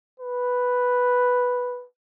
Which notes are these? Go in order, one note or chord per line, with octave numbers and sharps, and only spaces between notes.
B4